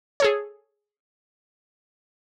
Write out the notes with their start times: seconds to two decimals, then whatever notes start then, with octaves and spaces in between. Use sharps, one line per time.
0.20 G#4 A4 C#5